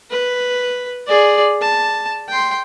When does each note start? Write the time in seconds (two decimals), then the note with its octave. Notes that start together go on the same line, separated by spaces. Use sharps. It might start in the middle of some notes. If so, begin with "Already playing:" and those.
0.11 B4
1.07 G#4 D5
1.62 A5
2.29 G5 C6